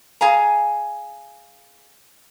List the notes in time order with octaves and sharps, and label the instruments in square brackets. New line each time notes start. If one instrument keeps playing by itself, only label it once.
[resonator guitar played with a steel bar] G#4 F5 G#5 A#5